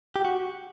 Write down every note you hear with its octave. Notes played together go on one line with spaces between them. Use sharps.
G4
F#4